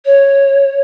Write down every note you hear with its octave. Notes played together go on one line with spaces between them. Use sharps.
C#5